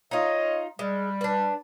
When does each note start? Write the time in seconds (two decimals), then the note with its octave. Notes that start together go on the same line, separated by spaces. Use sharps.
0.11 D#4 F4 C#5 D#5
0.79 G3 G#3
1.21 D4 B4